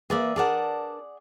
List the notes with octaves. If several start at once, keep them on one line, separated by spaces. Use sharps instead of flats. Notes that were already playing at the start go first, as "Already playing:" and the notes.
A#3 G#4 B4 D5 E5
D4 G#4 A#4 D5 F#5 A5